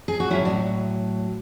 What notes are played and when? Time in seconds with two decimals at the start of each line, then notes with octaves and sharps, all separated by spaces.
0.08 G#4
0.20 F#4
0.30 A2 F#3 C#4 E4
0.45 D4 F#4